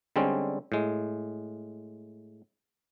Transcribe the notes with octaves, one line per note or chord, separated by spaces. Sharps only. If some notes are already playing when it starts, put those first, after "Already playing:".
D3 G3 G#3 C4 C#4
A2 G#3